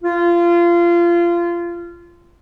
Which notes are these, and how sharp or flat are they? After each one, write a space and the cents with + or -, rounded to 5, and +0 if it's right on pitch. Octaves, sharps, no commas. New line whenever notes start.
F4 -25